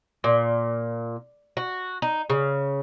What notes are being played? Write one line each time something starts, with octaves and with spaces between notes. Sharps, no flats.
A#2
F#4
D#4
C#3